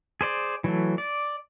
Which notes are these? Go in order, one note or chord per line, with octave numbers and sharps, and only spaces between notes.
G#4 C5 D5
E3 F#3 A3
D5